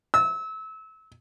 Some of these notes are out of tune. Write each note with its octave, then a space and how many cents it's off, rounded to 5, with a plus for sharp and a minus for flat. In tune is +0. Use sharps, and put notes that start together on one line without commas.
E6 -30